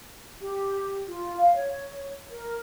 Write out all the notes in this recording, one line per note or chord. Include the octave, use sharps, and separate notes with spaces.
G4
F4
F5
C#5
A#4